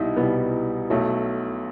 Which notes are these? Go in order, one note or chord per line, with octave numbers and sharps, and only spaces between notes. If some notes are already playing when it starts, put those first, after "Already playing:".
Already playing: C2 B2 G3 D#4 E4
C2 B2 G3 B3
B1 B2 F#3 A3